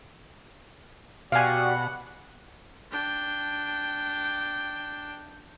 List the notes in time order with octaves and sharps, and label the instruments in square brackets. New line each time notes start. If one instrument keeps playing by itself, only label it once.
[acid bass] B2 [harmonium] F#4 G4 D5 [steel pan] F5 G#5 [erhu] F#5
[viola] D4 G5